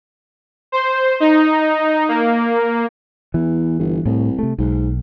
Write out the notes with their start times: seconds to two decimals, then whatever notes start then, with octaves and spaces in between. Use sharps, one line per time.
0.72 C5
1.20 D#4
2.09 A#3
3.34 E2 E3
3.79 G1
4.05 C2 A2
4.39 C3 A3
4.59 B1 G#2